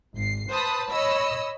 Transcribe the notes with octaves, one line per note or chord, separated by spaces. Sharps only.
G#1 C7
B4 C5 A5 B5 D#6
C#5 D#5 B5 E6